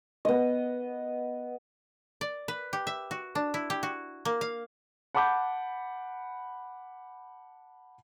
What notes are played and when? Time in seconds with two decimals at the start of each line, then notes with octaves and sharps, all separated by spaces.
0.25 B3 D#5
2.21 D5
2.48 B4
2.73 G4
2.87 E5
3.11 F#4
3.35 D4
3.54 E4
3.70 G4
3.83 F#4
4.25 A#3
4.41 F5
5.15 F#5 A5 B5 D6 G6